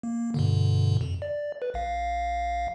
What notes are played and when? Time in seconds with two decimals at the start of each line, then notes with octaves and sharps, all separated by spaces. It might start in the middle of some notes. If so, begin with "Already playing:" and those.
0.03 A#3
0.34 G2 B2 D3
1.01 F2
1.22 D5
1.62 B4
1.74 A#1 F5